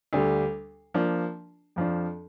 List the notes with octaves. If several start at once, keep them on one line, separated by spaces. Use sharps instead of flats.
D2 D3 G3
F3 A#3 D4
F2 F3 D4